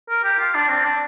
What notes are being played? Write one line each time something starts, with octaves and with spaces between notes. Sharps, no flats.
A#4
G4
F4
D4
C4
D4